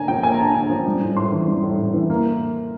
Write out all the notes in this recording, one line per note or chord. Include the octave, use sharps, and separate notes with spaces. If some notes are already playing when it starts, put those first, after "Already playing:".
Already playing: D3 A#3 G#5 A#5
F3 G5
A#3 G#5
A#5
D3 A5
D3 G#5
F3
G3
A2
A2 C6
E3
G3
A2
A2
E3
A#3